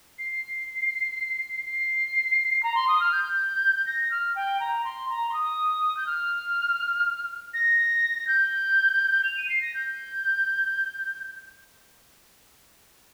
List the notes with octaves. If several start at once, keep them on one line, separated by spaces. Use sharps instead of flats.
C7
C7
A#5
C6
D#6
F6
G6
A#6
F6
G5
A#5
C6
A#5
C6
D#6
G6
F6
A#6
G6
F7
D#7
C7
A#6
G6